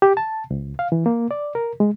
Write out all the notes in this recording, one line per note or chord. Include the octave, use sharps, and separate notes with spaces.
G4
A5
C#2
F5
E3
A#3
D5
A#4
G#3